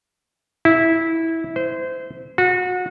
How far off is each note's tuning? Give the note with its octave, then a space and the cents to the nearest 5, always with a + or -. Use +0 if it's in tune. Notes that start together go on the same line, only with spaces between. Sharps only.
E4 -15
C5 -25
F#4 -30